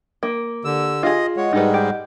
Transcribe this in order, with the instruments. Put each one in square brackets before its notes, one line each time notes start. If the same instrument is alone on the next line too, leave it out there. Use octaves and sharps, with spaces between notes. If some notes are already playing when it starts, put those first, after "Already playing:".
[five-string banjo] A#3
[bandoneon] D3 E6 [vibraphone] G4
[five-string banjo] F4 G#4 [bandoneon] D#5
[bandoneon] G#3 C#5 [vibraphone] D#5 F#5
[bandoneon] G#2 G3 G#3 [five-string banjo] D#4 A4 B4
[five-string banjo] G4